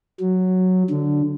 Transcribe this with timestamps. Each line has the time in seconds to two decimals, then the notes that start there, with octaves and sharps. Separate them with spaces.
0.20 F#3
0.90 D3